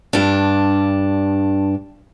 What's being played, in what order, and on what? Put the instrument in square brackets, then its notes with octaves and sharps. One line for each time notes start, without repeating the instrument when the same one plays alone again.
[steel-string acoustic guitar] G2 D4